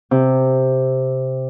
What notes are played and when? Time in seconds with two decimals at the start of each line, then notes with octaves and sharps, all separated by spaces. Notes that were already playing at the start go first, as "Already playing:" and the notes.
0.11 C3